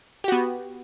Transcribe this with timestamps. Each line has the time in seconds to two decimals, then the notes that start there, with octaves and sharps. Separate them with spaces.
0.24 G4
0.28 F#4
0.32 B3